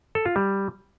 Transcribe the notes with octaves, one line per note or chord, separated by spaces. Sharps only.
A4
F4
G3